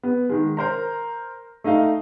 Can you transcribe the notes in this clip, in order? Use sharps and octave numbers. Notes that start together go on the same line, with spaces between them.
B3
D#3 G#3
A#4 C5 A#5
A3 D#4 D#5 F5